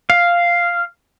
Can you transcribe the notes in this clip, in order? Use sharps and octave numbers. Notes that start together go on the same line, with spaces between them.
F5